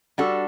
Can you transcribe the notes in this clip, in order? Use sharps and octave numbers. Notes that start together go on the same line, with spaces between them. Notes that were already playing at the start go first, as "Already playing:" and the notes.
G3 D4 F#4 A4